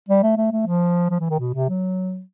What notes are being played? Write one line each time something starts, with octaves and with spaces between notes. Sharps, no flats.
G3
A3
A3
A3
F3
F3
E3
D#3
B2
C3
F#3